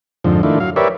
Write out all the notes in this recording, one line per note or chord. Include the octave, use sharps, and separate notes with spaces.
F2 G#2 D3 F3
D#3 A3 D4 E4 F4
F#3 F5
G4 A#4 B4 C#5 D5 E5